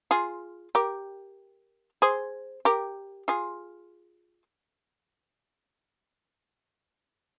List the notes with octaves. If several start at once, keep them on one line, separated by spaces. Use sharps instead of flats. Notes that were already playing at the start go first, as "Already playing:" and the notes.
F4 G#4
G4 A#4
G#4 C5
G4 A#4
F4 G#4